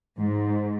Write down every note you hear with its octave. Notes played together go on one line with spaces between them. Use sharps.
G#2